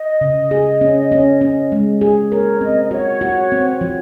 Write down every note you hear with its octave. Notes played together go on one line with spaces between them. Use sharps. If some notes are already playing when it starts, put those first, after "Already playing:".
Already playing: D#5
C#3
G#4
C#4
C#4
C#4
G#3
G#4
A#4 C#5
C4 D#5
D#5
F#4 C#5
F#4
C4
F3